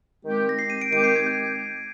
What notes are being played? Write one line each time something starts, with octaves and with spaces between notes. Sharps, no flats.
D#3 G#3 C4 G4
A#6
C7
D#7
D7
D#3 G#3 C4 G4 D7
C7
G#6
G6